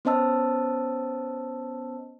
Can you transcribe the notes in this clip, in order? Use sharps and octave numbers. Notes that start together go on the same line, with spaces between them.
B3 C#4 C5 D#5 A5 E6